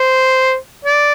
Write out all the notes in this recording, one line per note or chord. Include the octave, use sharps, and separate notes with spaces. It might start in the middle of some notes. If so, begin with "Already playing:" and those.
Already playing: C5
D5